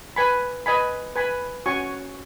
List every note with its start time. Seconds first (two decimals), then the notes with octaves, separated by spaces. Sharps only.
0.16 B4 G#5 B5
0.66 B4 D#5 G#5 B5
1.16 B4 G#5 B5
1.66 C#4 F#4 C#5 G#5 C#6